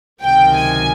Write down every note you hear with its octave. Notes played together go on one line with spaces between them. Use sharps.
C#2 C3 D#3 F#3 G5
G#5